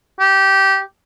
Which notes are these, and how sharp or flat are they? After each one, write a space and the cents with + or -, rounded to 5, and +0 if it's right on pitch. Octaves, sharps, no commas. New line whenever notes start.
G4 -15